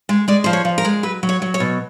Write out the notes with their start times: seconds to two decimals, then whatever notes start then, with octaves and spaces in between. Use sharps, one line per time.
0.09 G#3
0.28 G#3 D5
0.44 F3 C5
0.53 C#5
0.65 F3
0.78 A#4
0.85 G#3
1.03 F#3 B4
1.23 F#3
1.29 C#5
1.42 F#3
1.54 C#5
1.60 B2